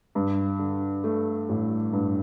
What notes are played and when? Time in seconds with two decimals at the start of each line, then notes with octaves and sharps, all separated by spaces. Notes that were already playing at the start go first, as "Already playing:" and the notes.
0.15 G2
0.59 D3
1.04 A3
1.49 A1
1.93 G2